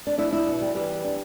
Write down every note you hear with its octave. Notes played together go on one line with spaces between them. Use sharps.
D4
D4 E4
D4 E4
B2
G3
E3 G3 G4
E2
D4